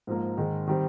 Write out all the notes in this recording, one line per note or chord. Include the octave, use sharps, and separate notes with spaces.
G#2 F3 A#3
G#2 D#3 G#3
D#3 G3 C4